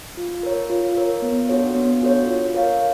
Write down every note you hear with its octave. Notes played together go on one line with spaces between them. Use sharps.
F4
A#4 C#5
F4
A#4 C#5
B3
D4 F#4 A4 C#5
B3
D4 F#4 A4 C#5
F4
A#4 C#5 F5